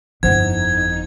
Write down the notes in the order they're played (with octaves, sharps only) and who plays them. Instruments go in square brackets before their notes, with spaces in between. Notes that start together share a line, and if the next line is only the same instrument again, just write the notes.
[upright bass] G1 E4 [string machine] F2 D#4 [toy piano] C5 F#5 [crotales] G#6